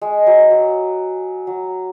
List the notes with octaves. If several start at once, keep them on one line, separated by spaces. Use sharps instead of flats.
G#3
F#3
F#3
F#3